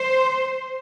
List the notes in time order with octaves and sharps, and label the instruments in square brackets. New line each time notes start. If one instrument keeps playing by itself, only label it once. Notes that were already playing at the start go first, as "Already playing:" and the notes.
Already playing: [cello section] C5